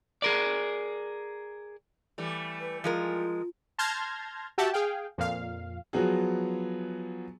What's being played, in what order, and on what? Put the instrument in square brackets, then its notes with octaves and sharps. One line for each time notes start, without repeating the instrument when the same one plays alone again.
[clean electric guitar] G#4 A#4 D5
[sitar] E3 G3 A3
[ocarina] B4
[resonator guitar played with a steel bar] F3 G#3 A#4 [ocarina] F4
[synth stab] A5 C6 F6 G6 G#6 A#6
F#4 G4 E5 F#5 G5 A5
G#4 F5 G5
F2 A#2 F5
[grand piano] F3 F#3 B3 F#4 G#4